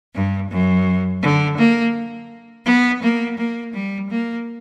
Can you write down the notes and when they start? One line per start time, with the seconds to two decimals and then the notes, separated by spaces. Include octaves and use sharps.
0.14 G2
0.50 F#2
1.22 D3
1.57 A#3
2.65 B3
3.01 A#3
3.37 A#3
3.73 G3
4.09 A#3